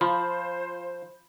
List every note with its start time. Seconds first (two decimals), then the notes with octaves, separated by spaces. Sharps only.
0.01 F3 F4 C5 F5 B5 C6